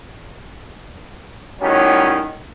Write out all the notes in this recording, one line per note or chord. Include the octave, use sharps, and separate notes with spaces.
A2 D#3 F#3 G3 C#4